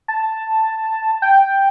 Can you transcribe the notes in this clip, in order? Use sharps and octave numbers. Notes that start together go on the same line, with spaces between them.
A5
G5